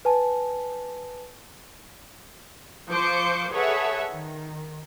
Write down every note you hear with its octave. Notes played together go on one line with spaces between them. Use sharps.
B4 G#5 A5
F3 C5 C#6 D6 G6 C#7
G#4 A4 B4 C#5 E5 F#5
D#3